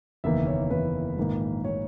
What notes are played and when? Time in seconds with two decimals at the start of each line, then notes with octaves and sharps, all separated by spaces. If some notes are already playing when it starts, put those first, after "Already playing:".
0.24 F#1 E2 D#3 A#3 E5
0.47 C#5
0.71 F#1 E2 D#3 A#3 B4
1.17 A#1 G#2 D#3 A#3
1.64 D#3 A#3 C#5